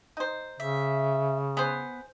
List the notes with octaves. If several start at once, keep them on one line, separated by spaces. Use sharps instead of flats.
D#4 C5
C#3 E5
B3 G#4 C5